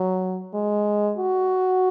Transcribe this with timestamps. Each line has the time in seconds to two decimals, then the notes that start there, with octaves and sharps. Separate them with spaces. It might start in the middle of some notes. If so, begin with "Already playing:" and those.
Already playing: F#3
0.53 G#3
1.18 F#4